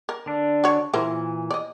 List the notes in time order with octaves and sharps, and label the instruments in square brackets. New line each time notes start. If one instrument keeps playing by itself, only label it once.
[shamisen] A#4
[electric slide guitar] D3 D4
[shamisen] F#4 C#5
[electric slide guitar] A#2 D#3 E3 [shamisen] E4 A#4 C5
[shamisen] D5 D#5